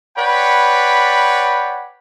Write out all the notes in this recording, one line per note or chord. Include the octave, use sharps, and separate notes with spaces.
B4 C#5 D5 F#5 G5 B5